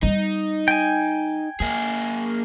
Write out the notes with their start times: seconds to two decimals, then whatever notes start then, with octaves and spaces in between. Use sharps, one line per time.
0.03 G3 B3 D#4
0.68 G5 G#5
1.60 A#3 C4 G#4